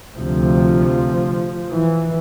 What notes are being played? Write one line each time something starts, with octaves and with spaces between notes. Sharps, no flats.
D2 C3 F3
E3